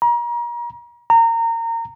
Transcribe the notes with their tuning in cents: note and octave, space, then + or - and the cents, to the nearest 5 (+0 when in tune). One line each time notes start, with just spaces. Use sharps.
A#5 +35
A#5 -25